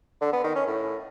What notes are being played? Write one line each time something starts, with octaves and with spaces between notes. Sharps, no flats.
D3
B3
D#3
C#4
A2